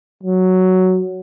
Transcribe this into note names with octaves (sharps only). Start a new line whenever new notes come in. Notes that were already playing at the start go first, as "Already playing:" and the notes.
F#3